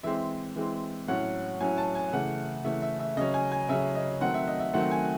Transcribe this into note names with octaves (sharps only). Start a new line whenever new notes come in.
E3 G#3 C4 E5
E3 G#3 C4
A2 F#3 C#4 F#5
A2 F#3 C#4 G#5
A5
G#5
C#3 E3 A3 F#5
C#3 E3 A3 E5
E5
E5
C#3 F#3 C#4 D#5
G#5
G#5
C#3 F#3 C#4 E5
D#5
D#3 F#3 A3 C4 F#5
E5
D#5
E5
D#3 F#3 A3 C4 F#5
G#5